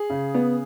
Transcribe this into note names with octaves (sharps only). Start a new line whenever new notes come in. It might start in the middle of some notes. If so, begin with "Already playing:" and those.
Already playing: G#4
C#3
B3